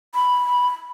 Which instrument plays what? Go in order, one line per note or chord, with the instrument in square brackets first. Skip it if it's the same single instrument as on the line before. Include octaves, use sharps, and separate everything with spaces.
[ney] B5